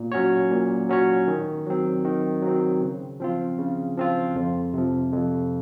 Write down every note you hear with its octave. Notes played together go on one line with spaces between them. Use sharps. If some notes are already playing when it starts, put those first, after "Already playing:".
Already playing: A#2
F#3 C#4 F#4 C#5
A#2
F#3 C#4 F#4 C#5
D#3
F#3 C4
D#3
F#3
C4
C#3
F3 C4 F4
C#3
F3 C4 F4
F2
C3 F3
F2